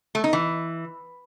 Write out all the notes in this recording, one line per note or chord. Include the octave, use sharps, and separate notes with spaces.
A3
D#4
E3